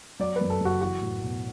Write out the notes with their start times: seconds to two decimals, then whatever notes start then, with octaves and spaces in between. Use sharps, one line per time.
0.20 F#3 D5
0.36 F#2 B4
0.50 A4
0.61 F#1 F#4
0.81 E3 F#4
1.01 A2
1.21 B1